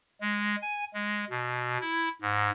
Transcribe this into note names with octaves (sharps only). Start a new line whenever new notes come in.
G#3
G#5
G#3
B2
E4
G#2